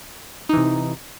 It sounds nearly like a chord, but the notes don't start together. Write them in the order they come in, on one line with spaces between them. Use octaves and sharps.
D#4 E3 C3